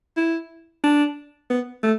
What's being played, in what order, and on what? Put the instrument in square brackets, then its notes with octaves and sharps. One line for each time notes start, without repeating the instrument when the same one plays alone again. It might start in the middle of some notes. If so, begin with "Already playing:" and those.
[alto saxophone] E4
D4
B3
A3